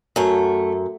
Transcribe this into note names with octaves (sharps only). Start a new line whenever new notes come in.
F#2 A3